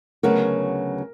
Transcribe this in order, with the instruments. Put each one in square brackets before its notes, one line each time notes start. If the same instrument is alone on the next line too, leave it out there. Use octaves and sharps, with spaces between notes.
[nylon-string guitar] D2 C#3 F#3 B3 F#4 [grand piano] A#4